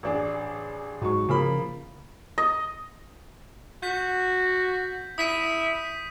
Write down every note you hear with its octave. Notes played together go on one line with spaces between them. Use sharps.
A1 D4 G#4
G#2 F#3 C#6
C#3 F3 A#3 B5
D#5
F#4 G6 B6
E4 D#6 B6 D#7